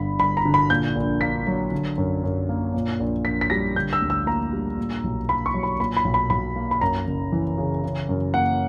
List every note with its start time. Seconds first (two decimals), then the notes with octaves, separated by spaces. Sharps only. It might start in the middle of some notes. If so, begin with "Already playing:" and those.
Already playing: G1 G2 B5
0.19 G1 B5
0.37 A#5
0.45 D3
0.54 B5
0.70 A#2 G6
0.95 A#1
1.21 A#3 B6
1.47 F#3
1.72 D3
1.98 F#2
2.24 F#2
2.49 A#3
2.74 A#2
3.00 A#1
3.25 A#1 B6
3.41 B6
3.50 G3 A#6
3.76 D3 G6
3.93 E6
4.02 D2
4.10 E6
4.27 A#3 A#5
4.53 G3
4.77 A#2
5.04 B1
5.29 A#3 B5
5.46 C#6
5.54 F#3
5.63 B5
5.80 A#2 B5
5.97 B5
6.04 B1
6.14 B5
6.30 B1 B5
6.56 A#3
6.71 B5
6.81 F#2 A#5
7.07 F#1
7.32 E3
7.58 C#3
7.84 C#3
8.09 F#2
8.34 A#3 F#5